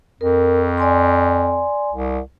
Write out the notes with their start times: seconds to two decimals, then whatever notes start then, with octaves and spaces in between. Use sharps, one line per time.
0.21 F2 A#4
0.78 D5 G#5 C6
1.93 C2